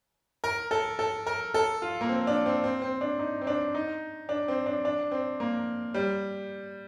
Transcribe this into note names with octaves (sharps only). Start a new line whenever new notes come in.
A#4
A4
A4
A#4
A4
F4
A#3
C4
D4
C4
C4
C4
D4
D#4
C4
D4
D#4
D4
C4
D4
D4
C4
A#3
G3